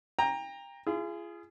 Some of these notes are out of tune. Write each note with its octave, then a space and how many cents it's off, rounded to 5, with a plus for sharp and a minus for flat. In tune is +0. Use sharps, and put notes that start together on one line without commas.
G5 +30 A#5 +0
F4 -40 G#4 +0